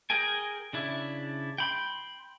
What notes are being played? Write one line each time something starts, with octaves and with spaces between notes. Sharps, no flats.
G#4 A#4 G5 G#5
C#3 D4 E4
G5 B5 C6